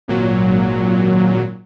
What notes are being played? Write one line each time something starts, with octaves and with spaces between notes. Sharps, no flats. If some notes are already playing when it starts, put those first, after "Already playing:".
G#1 A#2 F#3